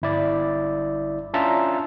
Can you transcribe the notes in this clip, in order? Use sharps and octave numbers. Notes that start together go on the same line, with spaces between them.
G1 E4 D5
C#4 D4 F4 E5 A5 A#5